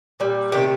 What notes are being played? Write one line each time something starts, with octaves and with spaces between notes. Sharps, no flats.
A#2 G3
C3 D#3 A3 G4